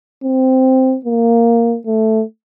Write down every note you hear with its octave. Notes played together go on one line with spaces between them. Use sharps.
C4
A#3
A3